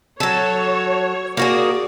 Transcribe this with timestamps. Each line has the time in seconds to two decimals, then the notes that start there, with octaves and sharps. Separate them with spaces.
0.20 F#3 A4 C#5
1.37 A#3 F#4 G#4 D5